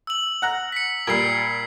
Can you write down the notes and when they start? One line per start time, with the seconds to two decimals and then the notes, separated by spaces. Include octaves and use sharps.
0.07 E6 F#7
0.42 F#5 A#5 F6
0.72 B6 C#7
1.07 A#2 G3 G#6 C7